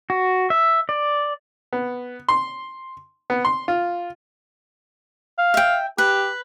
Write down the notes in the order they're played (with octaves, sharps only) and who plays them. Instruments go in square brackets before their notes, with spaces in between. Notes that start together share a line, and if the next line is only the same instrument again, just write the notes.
[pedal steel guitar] F#4
E5
D5
[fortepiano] B3
C6
B3
C6
F4
[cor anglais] F5
[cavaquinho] E5 G5
[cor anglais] G4 [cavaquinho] B4